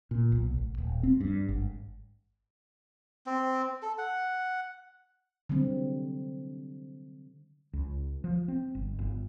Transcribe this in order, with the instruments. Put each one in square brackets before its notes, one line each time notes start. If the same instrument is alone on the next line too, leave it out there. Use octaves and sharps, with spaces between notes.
[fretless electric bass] A#2
B1
A1
D#1
C4
G2
G#1
[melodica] C4
A4
F#5
[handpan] D3 F#3 G3 C4
[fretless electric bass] C#2
F3
C4
G1
G1